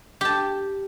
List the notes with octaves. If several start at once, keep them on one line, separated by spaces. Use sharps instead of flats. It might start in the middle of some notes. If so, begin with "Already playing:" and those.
G4 A5